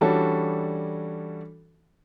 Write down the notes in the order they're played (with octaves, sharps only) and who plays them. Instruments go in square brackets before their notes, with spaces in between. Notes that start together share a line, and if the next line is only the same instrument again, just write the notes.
[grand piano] E3 G3 C#4 D4 F#4 A4